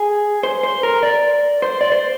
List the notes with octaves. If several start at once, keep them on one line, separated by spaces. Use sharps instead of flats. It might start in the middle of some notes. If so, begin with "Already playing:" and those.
Already playing: G#4
C5
C5
A#4
D5
C5
D5
C5